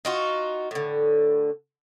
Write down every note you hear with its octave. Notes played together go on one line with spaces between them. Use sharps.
D#4 F4 F#4
A2 D3